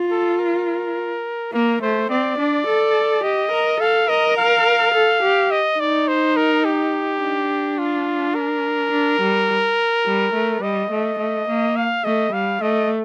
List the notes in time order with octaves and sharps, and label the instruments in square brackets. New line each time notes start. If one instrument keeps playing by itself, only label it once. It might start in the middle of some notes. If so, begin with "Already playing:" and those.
Already playing: [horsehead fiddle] F4
[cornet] A4
A#4
[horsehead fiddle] A#3 [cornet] A#4
[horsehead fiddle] A3 [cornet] C5
[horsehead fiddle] C4 [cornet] D5
[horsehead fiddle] D4
A4
[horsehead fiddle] G4 [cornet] D#5
[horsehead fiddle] A#4
[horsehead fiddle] A4 [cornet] F5
[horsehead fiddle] A#4 [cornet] D#5
[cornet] F5
[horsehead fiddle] A4
G4
[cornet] D#5
[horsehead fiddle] D#4 [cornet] D5
[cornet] C5
A#4
G4
[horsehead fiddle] D4
[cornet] F4
A#4
[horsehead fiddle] D4
G3
G3
A3
[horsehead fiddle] G3 [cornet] D#5
[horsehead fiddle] A3
A3
A#3
[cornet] F5
[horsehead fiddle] A3 [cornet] D#5
[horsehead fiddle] G3 [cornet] F5
[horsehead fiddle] A3 [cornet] D#5